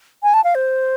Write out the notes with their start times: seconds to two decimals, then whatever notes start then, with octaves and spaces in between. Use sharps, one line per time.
0.23 G#5
0.34 A5
0.44 F5
0.55 C5